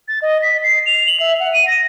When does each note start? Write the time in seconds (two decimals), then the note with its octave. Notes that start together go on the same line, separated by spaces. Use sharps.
0.08 A6
0.22 D#5
0.42 B6
0.63 C7
0.86 F7
1.07 F#7
1.20 E5
1.40 F#5
1.53 D#7
1.67 A#6